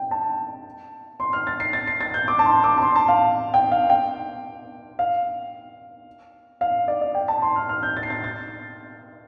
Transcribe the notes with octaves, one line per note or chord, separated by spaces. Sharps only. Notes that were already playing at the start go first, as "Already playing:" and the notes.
Already playing: G5
A5
C6
F6
A6
C7
A6
C7
A6
G6
D6
A5
C6
D6
A5
C6
A5
F5
G5
F5
G5
F5
F5
D5
D5
G5
A5
C6
F6
F6
G6
A6
C7
A6
A6